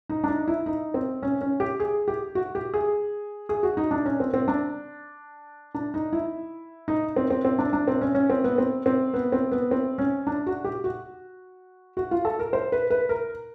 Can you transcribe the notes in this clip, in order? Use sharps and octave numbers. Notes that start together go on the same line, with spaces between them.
D#4
D4
D#4
E4
D#4
C4
C#4
C#4
G4
G#4
G4
F#4
G4
G#4
G#4
F#4
D#4
D4
C#4
C4
C4
D4
D4
D#4
E4
D#4
C4
C4
C4
D4
D4
C4
C#4
C#4
C4
B3
C4
C4
B3
C4
B3
C4
C#4
D4
F#4
G4
F#4
F#4
F4
A4
A#4
C5
B4
B4
A#4